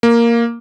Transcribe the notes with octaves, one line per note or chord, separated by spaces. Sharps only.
A#3